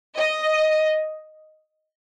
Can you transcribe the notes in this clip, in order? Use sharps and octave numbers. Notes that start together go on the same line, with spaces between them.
D#5